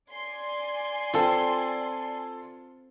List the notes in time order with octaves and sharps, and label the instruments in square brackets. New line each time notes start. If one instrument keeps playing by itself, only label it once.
[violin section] D5 G#5 C6
[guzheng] C4 [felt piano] F4 A4